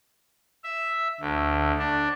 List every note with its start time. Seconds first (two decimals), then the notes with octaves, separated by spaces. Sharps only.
0.64 E5
1.21 D2
1.78 D4